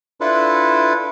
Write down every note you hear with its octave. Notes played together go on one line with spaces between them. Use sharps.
D4 E4 F4 A4 B4